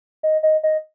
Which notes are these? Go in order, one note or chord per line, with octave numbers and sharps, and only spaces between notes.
D#5
D#5
D#5